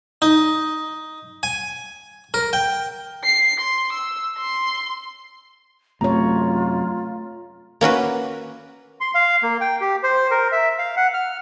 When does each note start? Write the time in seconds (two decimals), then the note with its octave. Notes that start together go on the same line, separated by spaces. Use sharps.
0.22 D#4
1.43 G#5
2.34 A#4
2.53 G5
3.24 C7
3.60 C6
3.92 E6
4.38 C6
6.01 F#2 C3 A3 F4 C#5 A#5
7.81 A#3 C#4 F#4 B4
9.01 C6
9.15 F5
9.43 A#3
9.61 G5
9.81 G4
10.03 C5
10.31 A#4
10.52 E5
10.78 F5
10.97 F#5
11.14 F6